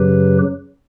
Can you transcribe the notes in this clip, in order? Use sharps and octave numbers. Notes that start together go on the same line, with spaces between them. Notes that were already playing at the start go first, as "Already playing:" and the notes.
Already playing: F#2 C#3 F#3 G4 B4